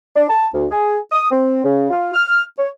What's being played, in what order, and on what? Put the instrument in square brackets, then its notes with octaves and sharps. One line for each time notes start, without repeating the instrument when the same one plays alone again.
[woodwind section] D4
A5
D2
G#4
D#6
C4
C#3
F4
F6
C#5